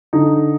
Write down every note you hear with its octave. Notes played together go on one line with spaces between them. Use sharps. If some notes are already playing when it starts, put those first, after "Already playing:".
D3 D#4